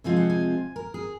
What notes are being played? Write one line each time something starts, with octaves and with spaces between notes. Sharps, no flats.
C3 F3 G#3 C4 F4 G#5
F#5
G#5
A#4
G#4